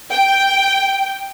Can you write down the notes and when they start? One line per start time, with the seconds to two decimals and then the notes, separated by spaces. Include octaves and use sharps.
0.12 G5